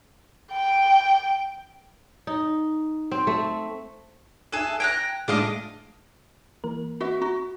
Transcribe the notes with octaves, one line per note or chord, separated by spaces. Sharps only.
G5
D#4
C4
A3
G#4 A4 E5 G#5 F#6
G5 A#5 F#6 G#6
A2 G#3 A3 D4 F4 D#5
E3 A#3 A#4
F#4 E5
F#4 A#5